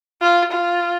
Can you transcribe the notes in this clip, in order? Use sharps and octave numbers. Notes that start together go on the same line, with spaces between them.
F4
F4